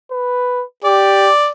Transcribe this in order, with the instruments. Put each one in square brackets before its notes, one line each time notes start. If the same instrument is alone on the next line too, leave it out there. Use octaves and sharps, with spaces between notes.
[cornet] B4
[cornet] G4 [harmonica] D5